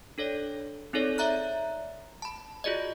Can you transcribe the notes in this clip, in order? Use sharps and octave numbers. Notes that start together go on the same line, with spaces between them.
D4 A4 C#5 D5
C4 D#4 G#4 A4 C#5 D5
C#5 D5 E5 A#5 F#6
A5 B5
F4 F#4 G#4 D5 D#5